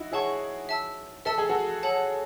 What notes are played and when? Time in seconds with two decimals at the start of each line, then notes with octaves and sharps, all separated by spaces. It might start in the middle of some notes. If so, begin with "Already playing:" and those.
Already playing: D#4 E4 F#4
0.12 E4 G#4 C#5 F#5 A5 C#6
0.69 E5 A5 E6
1.25 A4 E5 A5 E6
1.38 G#4
1.49 F#4 A4
1.83 A4 C#5 F#5 A5